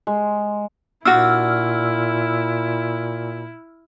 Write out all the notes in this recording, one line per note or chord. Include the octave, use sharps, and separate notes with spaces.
G#3
A#2 D4 E4 F#4 E6 F6